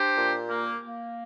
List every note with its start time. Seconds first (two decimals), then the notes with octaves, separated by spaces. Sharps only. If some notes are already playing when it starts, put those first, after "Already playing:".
Already playing: D4 G4 C5
0.18 A#2
0.49 A#3
0.82 A#3